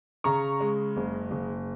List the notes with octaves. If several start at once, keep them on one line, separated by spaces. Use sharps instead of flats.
C#3 A#5 C#6
G#3
F#1
F#1